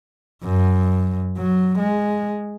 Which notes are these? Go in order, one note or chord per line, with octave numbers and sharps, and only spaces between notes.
F#2
F#3
G#3